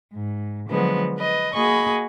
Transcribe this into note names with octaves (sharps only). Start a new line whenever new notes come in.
G#2
D3 F3 F#3 G#3 B3 C5
B4 D#5
A#3 F#4 G#4 D#5 B5 C#6